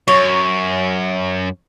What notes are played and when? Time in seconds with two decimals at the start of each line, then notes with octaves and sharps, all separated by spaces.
0.08 F#2 C#5